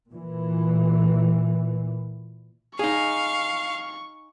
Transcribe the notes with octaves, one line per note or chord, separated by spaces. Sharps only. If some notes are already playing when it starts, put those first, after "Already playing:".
A#2 E3
D#4 G#4 F5 C#6